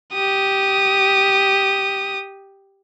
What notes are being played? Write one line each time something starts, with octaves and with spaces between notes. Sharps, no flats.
G4 D#6